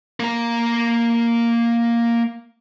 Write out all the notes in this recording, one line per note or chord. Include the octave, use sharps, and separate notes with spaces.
A#3 A#5